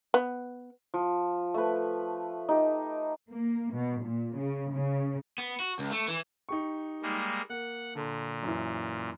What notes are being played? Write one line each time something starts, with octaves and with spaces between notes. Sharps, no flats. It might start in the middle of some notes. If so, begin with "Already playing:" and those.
B3
F3
A3 B4
D#4 G4
A#3
B2
A#2
C#3
C#3
B3
F#4
C#2
A3
E3
D#4 G4 C#6
G3 G#3 A#3
A#3 F#5
A#2 D3
F#2 E3